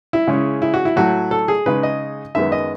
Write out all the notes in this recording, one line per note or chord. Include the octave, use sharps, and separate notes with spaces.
E4
C#3 G#3 C#4 E4
E4
F#4
E4
A2 F#3 A3 F#4
A4
G#4
C#3 G#3 D#4 B4
D#5
F#2 D#3 G#3 B3 D#4 E5
D#5